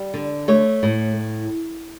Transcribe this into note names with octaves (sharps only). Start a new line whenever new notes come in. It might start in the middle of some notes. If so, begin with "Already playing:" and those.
Already playing: G3
D3
A3 C#5
A2